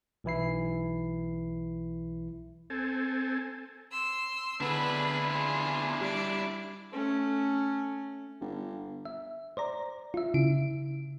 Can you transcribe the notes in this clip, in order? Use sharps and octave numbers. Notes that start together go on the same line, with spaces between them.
B1 E3 E4 C7
C4 A4 G#5
C6 E6
D3 B3 D4 E4 G#4 B4
F4 G#4
G3 D5
A3 C#4
G1
E5
C5 D5 A#5
F4 E5
C#3 E4 D7